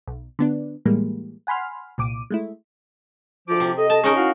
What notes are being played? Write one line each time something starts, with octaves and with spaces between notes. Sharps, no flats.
B1
D3 B3 D4
A2 E3 G3 G#3 A#3
F#5 G#5 B5 C6 F6
C2 A#2 D6 D7 D#7
G#3 A3 E4
D2 F3 F4 D6
C3
A4 D#5
A4 A5
C#4 D#4 G#4 A#4
E4 F#4 F5